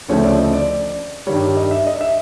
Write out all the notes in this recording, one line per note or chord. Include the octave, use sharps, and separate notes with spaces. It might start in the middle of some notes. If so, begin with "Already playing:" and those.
D2 C#3 F3 A3 C4 C#5
D5
D#5
D5
G2 D#3 G3 C#5
D#5
E5
D#5
E5